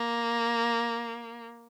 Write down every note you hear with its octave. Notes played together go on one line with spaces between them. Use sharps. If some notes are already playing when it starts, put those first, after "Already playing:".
Already playing: A#3